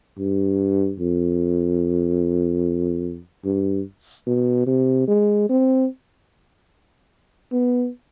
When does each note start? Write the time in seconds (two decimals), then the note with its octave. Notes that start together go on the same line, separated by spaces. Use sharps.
0.19 G2
1.00 F2
3.45 G2
4.27 B2
4.67 C3
5.08 G#3
5.49 C4
7.52 B3